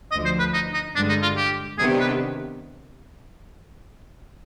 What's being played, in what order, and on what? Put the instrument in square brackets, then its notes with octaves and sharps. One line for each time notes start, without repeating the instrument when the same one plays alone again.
[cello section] D2 D3 F3 [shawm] D#5
[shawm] C5
B4
D#4
D#4
[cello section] G2 D3 G#3 [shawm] D4
[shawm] D#4
F4
G4
[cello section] C3 D#3 B3 D4 G4 [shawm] G#4
[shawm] B4